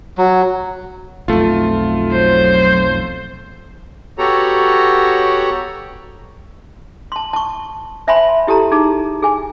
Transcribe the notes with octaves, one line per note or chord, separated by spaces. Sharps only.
F#3
B1 F2 A3 F4
F#3 C5
B3 F#4 G4 A4 C#5 A#5
A5 C6
A5 C#6
C5 E5 G#5 A5 B5 C6
E4 G4 A4 A5 A#5
D#4 G#4 A5
G#4 G#5